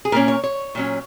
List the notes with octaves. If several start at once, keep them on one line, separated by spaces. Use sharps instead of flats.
G#4
A#2 A#3 C#4 A#4
C#5
C#5
A#2 F#3 C#4